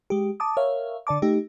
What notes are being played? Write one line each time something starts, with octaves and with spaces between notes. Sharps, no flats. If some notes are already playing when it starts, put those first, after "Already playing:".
G#3 G4
A5 D6 D#6
A#4 C#5 E5 F5
D3 D5 A5 D6
A3 D#4 G4